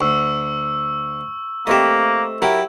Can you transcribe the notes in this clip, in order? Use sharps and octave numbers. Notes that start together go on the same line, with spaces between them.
D2 C#6 E6
A3 A#3 C4 G4 D#5 E5
F#3 E4 G4 A#4